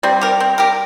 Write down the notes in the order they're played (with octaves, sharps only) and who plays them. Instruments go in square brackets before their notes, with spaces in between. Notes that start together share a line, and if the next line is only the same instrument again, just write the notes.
[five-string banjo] G3 [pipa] C4
[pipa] G4 A#4
C4
G4 A#4